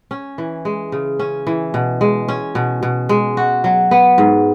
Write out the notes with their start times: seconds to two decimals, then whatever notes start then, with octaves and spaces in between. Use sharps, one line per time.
0.11 C#4
0.38 E3
0.65 G#3
0.92 C#3
1.19 C#4
1.47 E3
1.74 B2
2.01 G#3
2.28 C#4
2.55 B2
2.83 B2
3.09 G#3
3.37 F#4
3.64 F#3
3.91 B3
4.18 G#2